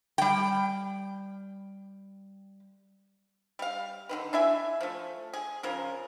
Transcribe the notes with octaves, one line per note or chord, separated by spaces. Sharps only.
G3 G5
G3 F5
D3 D#3 B4
D4 E4 E5 G#5
F3 A3
G#4
C#3 F3 A#4